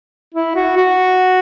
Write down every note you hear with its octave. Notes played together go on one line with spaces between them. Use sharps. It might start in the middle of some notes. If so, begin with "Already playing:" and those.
E4
F#4
F#4